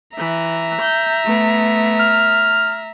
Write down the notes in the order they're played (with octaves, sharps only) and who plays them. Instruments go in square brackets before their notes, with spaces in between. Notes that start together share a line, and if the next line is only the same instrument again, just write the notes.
[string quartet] E3 [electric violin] E5 A#5
[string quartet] G6
A3 B3
[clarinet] F6